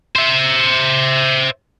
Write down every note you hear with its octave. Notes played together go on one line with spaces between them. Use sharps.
C5 E5